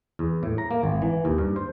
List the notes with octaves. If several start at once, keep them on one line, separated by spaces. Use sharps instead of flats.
E2
A2
A#5
A#3
G#1
E3
D#2
G2
C5